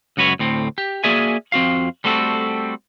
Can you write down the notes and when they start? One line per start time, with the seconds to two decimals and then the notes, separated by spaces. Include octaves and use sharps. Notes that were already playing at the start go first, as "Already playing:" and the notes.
0.17 C#2 F#2 F#4 B4 C#5
0.39 D2 A2 C4
0.78 G4
1.04 A#3 F#4 G#4 D5 E5 G#5
1.52 F2 C4 F#4 F5
2.04 G3 A3 C4 F#4 G#4 A4